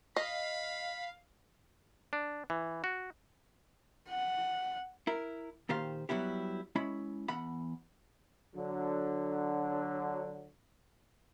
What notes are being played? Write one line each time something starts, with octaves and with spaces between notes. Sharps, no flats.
D#5 F5 B5
D4
E3
F#4
F#5
E4 A#4
A#2 D#3 G4 C5 F5
F#3 G3 B3 E4 G4
G#3 C#4 E4 B5
E2 F#5 B5
D3 F#3